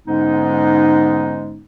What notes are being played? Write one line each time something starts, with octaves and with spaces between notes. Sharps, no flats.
G#2 D3 G#3 B3 C#4 D#4